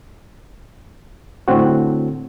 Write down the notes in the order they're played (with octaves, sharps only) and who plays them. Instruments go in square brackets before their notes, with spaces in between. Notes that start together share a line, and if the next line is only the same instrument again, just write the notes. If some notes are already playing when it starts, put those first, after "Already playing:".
[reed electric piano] A2 D3 C4 F#4